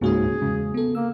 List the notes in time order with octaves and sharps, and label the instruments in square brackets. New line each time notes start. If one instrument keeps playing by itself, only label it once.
[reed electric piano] C#2 G#2 C#4 [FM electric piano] A#3 F#4 C#5 [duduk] G#4
[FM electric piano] E2 G#3 [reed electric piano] C#3
[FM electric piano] B3 A4
[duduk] A#3 [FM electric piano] E6